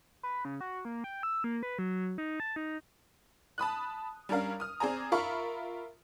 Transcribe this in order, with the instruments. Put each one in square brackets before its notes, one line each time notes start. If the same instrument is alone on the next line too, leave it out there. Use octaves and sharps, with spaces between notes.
[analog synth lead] B4
C#3
F#4
A#3
G5
E6
A#3
B4
F#3
D#4
A5
D#4
[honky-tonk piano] A5 B5 D#6 F#6
G3 C#4 D4 A#4 F5
D#6 F6
C4 G#4 D5 G#5 A#5
F4 A#4 E5 F5 B5 C#6